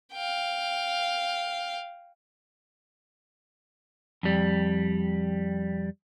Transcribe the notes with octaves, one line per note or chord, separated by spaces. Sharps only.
F5 G5
F2 G3